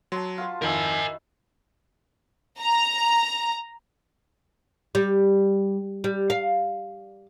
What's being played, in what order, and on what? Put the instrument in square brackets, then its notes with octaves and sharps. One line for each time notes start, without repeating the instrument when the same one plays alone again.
[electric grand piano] F#3 [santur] A5 C6
[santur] F4 F#4 B4
[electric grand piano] F2 D#3 [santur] D#4 E4 [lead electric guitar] A#4 G#5
[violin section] A#5
[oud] G3
G3
F5